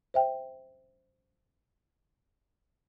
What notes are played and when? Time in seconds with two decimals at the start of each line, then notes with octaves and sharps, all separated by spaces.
0.14 C5 E5 G5